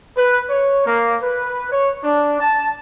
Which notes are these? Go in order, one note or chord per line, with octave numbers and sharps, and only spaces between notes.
B4
C#5
A#3
B4
C#5
D4
A5